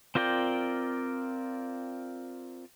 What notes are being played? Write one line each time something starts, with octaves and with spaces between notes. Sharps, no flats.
C4 F4 A#4 D5 G5